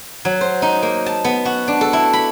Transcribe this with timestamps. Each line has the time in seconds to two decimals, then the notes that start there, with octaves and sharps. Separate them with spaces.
0.25 F#3
0.41 C5
0.62 D#4
0.83 A#3
1.06 A5
1.25 B3
1.45 F#4
1.68 D4
1.81 A4
1.93 E4
2.13 B5